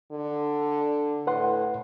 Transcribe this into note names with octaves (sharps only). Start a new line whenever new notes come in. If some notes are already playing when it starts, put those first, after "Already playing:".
D3
A2 B4 F#5 C6